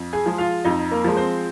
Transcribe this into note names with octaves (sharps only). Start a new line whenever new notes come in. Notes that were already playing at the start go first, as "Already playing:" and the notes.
Already playing: F2
G#4 G#5
F3 G#3
F4 F5
F2 D#4 D#5
A#3 A#4
F3 G#3
C4 C5